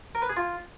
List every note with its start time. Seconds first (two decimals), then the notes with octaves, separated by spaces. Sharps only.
0.15 A#4
0.22 B4
0.29 G#4
0.37 F4